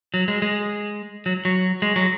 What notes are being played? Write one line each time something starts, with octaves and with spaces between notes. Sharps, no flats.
F#3
G#3
G#3
F#3
F#3
G#3
F#3